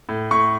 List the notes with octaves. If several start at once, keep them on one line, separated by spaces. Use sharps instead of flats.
A2
A2 C#6